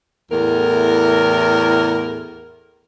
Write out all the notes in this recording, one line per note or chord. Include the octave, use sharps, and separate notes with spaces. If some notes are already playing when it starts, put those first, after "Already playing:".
E2 A2 A#4